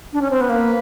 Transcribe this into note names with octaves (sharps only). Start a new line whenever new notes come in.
D4
C#4
C4
B3
A#3 B4